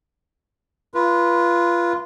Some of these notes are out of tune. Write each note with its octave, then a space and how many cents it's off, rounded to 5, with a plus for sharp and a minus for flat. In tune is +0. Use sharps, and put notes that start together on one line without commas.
F4 -20 B4 -25